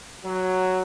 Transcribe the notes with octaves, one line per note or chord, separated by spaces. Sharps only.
F#3